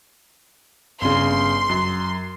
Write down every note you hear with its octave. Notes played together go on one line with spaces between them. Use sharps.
G1 C#3 C6
F#2